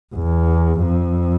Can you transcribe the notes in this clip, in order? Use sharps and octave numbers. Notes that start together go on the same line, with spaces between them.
E2
F2